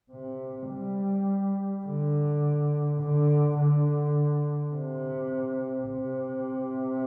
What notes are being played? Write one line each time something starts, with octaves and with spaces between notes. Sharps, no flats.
C3
G3
D3
D3
D3
C3
C3